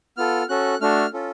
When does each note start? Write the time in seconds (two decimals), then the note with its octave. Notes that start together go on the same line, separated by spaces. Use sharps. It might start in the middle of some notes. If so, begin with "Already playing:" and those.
0.17 B3 F4 A4 F6
0.49 C#4 F#4 A4 F#6
0.81 A3 D4 F#4 A4 F6
1.13 C#4 F4 A4